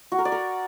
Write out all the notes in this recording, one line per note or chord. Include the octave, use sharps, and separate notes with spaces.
F#4
A#4
D5
A#4